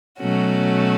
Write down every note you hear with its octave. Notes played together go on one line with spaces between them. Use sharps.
B2 F#3 A3 C#4 F#4